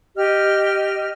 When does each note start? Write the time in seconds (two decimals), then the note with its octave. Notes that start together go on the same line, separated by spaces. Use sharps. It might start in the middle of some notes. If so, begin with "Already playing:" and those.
0.16 G4 D#5 F6